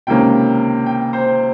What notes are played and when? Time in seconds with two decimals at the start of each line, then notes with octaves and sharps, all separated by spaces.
0.07 C#2 C3 D#3 A#3 C#4 G5
0.86 G5
1.13 C5